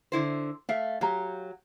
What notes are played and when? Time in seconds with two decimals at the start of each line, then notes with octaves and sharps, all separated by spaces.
0.12 D3 E4 C5
0.69 A3 E5 F5
1.01 F#3 G4 F5 A#5